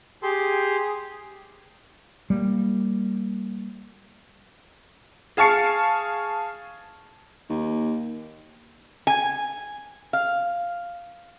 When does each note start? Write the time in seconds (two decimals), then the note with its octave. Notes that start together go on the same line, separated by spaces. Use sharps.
0.23 G4 G#4 C6
2.30 G3 A#3
5.37 G#4 F5 A5 C#6 C7 C#7
7.49 D#2
9.07 G#5
10.13 F5